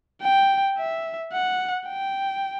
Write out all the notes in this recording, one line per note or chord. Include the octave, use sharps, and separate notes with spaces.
G5
E5
F#5
G5